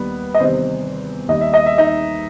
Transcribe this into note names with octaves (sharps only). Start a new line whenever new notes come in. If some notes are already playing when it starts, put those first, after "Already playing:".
Already playing: D#2 D#3 G3 B3
D#5
E2 C3 D#3 G3 C4 C5
D#2 D#3 G3 D#5
E5
D#5
E5
D#4 D#5